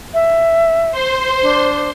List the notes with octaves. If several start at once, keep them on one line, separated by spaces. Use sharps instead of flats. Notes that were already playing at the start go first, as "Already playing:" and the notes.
E5
C5 C6
D4